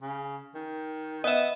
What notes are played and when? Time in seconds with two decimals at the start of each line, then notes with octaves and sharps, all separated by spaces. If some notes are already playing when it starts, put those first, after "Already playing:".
0.02 C#3
0.54 D#3
1.24 B3 D#5 E5